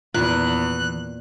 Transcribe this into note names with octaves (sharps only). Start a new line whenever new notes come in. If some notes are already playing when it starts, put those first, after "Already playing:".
E2 A#2 D#3 E3 F#6